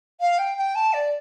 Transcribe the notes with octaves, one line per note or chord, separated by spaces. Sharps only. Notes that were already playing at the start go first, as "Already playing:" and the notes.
F5
G5
G5
A5
D5